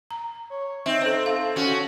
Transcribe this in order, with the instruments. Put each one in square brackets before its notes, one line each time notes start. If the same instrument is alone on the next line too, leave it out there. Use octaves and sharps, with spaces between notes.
[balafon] A#5
[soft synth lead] C#5
[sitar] C4 [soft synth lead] D#4 [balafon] E5
[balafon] A4 C5
[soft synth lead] A4 [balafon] F5
[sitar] C#4 F#4